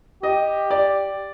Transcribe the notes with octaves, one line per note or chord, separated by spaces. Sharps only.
G4 D#5
D5